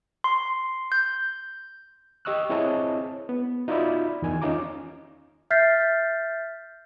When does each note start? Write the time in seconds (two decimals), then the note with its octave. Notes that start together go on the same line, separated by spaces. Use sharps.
0.24 C6
0.92 G6
2.25 G4 D#5 C#6 E6 F#6
2.50 C4 E4 G#4 C#5 D#5 A5
3.29 B3
3.68 D#4 F4 F#4 D5 E5 B5
4.22 E2 D#3 G#5
4.42 C#4 D#4 F4 A#5 D6
5.50 E5 F6 G6 A6 B6 C7